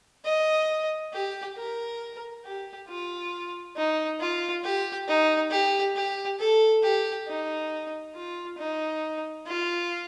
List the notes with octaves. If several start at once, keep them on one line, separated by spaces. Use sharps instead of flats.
D#5
G4
A#4
G4
F4
D#4
F4
G4
D#4
G4
G4
A4
G4
D#4
F4
D#4
F4